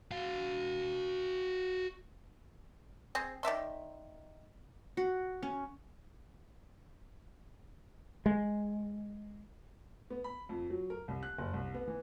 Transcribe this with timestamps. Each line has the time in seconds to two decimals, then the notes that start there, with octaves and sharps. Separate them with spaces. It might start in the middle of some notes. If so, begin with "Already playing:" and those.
0.11 F#4 F5
3.15 C4 G#4
3.43 D#3 D5 E5 C6
4.97 F#4
5.43 C#4
8.26 G#3
10.10 B3
10.24 B5
10.49 F2
10.70 F#3
10.90 A#4
11.08 C2
11.23 F#6
11.38 F#1
11.54 C2
11.74 B3
11.87 E3